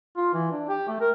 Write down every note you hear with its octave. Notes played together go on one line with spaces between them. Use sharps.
F4
E3
D4
G4
A3
A#4